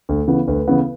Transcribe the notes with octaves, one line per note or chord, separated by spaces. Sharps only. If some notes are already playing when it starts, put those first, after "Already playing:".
D2
C#3 E3 B3
D2 B4
C#3 E3 B3